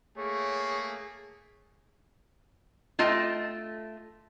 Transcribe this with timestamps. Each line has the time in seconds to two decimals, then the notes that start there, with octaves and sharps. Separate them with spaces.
0.17 A3 A#3 G#4 C#5
2.99 A3 F4 D#5 G5 A5